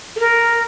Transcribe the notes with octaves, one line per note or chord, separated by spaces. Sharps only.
A4
A#4